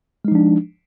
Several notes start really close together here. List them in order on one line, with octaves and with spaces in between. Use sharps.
G#3 D#4 F3 D4